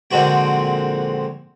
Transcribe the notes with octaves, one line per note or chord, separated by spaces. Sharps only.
A#1 D3 G#3 C4 F#4 G5